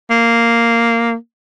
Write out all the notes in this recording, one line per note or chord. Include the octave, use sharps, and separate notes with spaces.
A#3